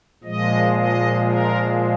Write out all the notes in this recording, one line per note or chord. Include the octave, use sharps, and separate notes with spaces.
A#2 F3 G#3 D#5
D#5
A#4